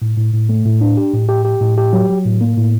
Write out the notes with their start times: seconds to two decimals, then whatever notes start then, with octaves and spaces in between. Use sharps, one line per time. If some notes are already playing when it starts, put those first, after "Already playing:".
0.02 A2
0.17 A2
0.33 A2
0.49 A3
0.65 A2
0.81 D4
0.97 G4
1.13 A2
1.29 G4
1.45 G4
1.61 A2
1.78 G4
1.93 F#3
2.10 F#3
2.25 A2
2.41 A#3
2.57 A2